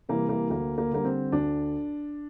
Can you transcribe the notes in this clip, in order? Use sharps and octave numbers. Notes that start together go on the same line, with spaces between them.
C3 E3 G3 A#3
A#3
D2 A#3
A#3
D3 G3 A#3
C4
D2 D4